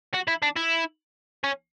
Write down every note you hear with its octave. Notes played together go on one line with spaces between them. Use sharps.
F#4
E4
D4
E4
C#4